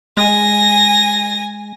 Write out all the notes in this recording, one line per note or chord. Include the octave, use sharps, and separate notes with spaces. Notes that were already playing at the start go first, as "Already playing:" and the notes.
G#3 G#5 A#6